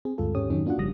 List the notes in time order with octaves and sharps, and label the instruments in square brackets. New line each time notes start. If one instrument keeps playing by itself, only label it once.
[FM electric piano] C4 G#4
D2 G2 G#3 F4 A4
D#2 G#2 C#4 G4 C#5 D#6
F2 G#2 D#3 F#3 C#4 D#4
A#3 D4 F4 F#4 F#5
G1 C#3 F3 G3 D#6 A#6